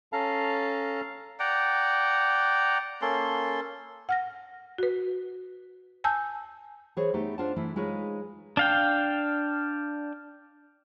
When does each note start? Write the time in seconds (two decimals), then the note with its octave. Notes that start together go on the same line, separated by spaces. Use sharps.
0.13 C#4 A4 F5 A5 A#5
1.40 D5 F#5 G5 A#5
3.02 A#3 C#4 A4 C6
4.09 F#5 F6 A#6
4.78 F#4 B4
6.04 G#5 A5 E6 G6
6.97 E3 G#4 C5 C#5
7.14 A3 B3 D#4 G4
7.38 D4 F4 C5 F#5 A5
7.56 E3 A3 E4
7.76 G#3 D#4 F4 G#4 B4 C#5
8.57 D4 F5 G5